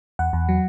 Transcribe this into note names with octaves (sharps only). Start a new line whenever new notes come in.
E2 F#5
E2
F#3